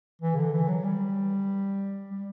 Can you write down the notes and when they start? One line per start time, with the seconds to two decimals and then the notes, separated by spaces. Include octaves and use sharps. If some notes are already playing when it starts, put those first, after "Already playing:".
0.21 E3
0.33 C#3
0.36 D3
0.53 E3
0.68 F#3
0.84 G3
2.10 G3